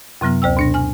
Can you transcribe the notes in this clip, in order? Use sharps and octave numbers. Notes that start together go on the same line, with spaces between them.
F#2 C3 F#3 B3 F6
D2 C5 G5 E6
B2 D4 A#6
G#5 F6